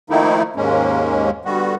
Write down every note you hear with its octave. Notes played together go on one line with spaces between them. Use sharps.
D#3 F3 A3 A#3 D#4 E4
D#2 G#2 G#3 A#3 C#4
D3 G3 B3 F#4